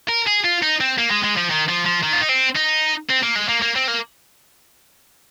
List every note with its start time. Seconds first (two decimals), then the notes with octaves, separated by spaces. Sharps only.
0.09 A#4
0.27 G#4
0.45 F4
0.63 D#4
0.81 C4
0.98 A#3
1.10 G#3
1.23 G#3
1.37 F3
1.50 D#3
1.69 F3
1.85 F3
2.03 D#3
2.13 F4
2.21 D#4
2.29 C4
2.56 D#4
3.09 C4
3.23 A#3
3.35 G#3
3.49 A#3
3.62 A#3
3.75 C4
3.88 A#3